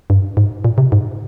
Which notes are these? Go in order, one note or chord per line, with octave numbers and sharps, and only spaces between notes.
G2
G#2
A#2
C3
G#2